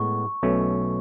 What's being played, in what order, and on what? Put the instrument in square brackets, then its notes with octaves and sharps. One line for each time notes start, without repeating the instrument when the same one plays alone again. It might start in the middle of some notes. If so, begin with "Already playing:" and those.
Already playing: [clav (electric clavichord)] A2 G#3 B3 [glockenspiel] C#6
[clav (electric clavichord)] B1 B2 A3 C#4